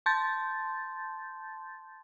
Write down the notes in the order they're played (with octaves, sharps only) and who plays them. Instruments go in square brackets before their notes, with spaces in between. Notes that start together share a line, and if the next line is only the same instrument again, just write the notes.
[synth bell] A5 C6 G6 A6